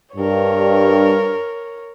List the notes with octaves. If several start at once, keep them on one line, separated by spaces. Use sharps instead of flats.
G2 A#4 C#5